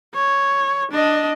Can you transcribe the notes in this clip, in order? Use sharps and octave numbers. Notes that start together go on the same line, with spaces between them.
C#5
D4 D#5